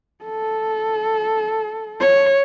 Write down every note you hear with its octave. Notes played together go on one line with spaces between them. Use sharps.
A4
C#5